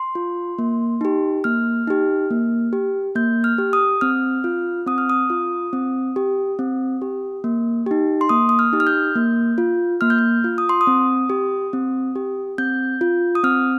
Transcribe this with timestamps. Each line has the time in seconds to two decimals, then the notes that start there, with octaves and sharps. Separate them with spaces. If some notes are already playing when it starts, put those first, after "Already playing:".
Already playing: C6
0.15 F4
0.59 A#3
1.01 D#4 G4
1.44 A#3 F6
1.87 D#4 G4
2.31 A#3
2.73 G4
3.15 A#3 G6
3.44 F6
3.58 G4
3.73 D#6
4.01 C4 F6
4.44 F4
4.87 C4 D#6
4.98 F6
5.10 D#6
5.30 F4
5.73 C4
6.16 G4
6.59 C4
7.02 G4
7.44 A#3
7.86 D#4 G4
8.21 C6
8.29 A#3 D#6
8.49 D#6
8.59 F6
8.73 D#4 G4
8.80 F6
8.87 G6
9.15 A#3
9.58 F4
10.01 A#3 F6
10.10 G6
10.19 F6
10.44 F4
10.58 D#6
10.69 C6
10.81 D#6
10.87 C4
11.30 G4
11.73 C4
12.16 G4
12.58 C4 G6
13.01 F4
13.35 D#6
13.44 C4 F6